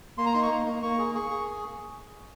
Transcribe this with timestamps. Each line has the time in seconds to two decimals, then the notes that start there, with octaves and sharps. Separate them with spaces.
0.18 A#3 C6
0.26 A#5
0.34 D#4 C6
0.43 C#6
0.51 A#3
0.66 A#3
0.83 A#3 C#6
0.99 G#4
1.15 G#4 C#6
1.31 G#4